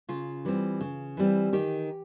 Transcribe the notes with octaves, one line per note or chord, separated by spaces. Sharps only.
C#3 F4
E3 G3 C4
C#3
E3 G3 C4
D#3 G4